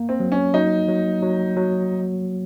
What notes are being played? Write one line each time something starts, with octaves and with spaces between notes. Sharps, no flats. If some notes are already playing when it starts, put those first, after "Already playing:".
Already playing: A#3
C4
F#3
C#4
F#3 D#4
F#3
F#3
F#3